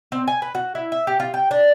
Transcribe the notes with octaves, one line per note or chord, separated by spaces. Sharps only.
C4
G#5
B4
F#4
E4
E5
G4
F4
G5
D4